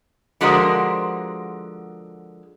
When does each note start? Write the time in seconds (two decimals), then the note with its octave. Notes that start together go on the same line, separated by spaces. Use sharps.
0.41 D3 F3 G#3 F#4 A#4 C5